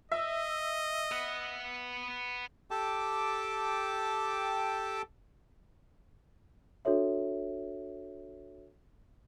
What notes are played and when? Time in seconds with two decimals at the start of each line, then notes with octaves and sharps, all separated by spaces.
0.12 D#5 E5
1.12 B4 F#5
2.71 G4 A4 G5 A5 D6
6.85 D4 F#4 A4 C#5 E5